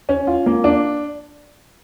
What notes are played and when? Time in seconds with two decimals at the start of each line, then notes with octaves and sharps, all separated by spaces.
0.09 C#4
0.27 F4
0.46 A#3
0.64 D4